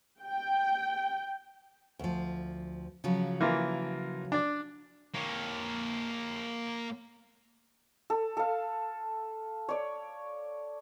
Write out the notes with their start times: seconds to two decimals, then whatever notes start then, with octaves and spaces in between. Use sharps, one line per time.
0.23 G5
1.99 D2 F3
3.04 C#3 F3 F#3
3.41 E3 A#3 F4
4.32 D4 D5
5.15 A#3 C#5
8.10 A4
8.37 A4 F5
9.69 C#5 D5